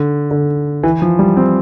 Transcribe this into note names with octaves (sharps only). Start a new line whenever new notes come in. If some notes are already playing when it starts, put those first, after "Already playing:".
Already playing: D3
D3
E3
F3
G3
C4